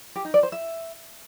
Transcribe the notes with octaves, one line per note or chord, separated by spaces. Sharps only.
G4
D#4
D5
C5
E5